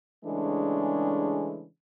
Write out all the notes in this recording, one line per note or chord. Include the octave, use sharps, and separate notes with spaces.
C#3 E3 G#3 A3 D4